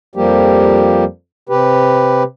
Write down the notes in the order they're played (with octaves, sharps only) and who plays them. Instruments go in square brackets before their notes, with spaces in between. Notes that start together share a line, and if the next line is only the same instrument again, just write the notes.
[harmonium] F2 F3 G3 A#3 G4
C3 G4 B4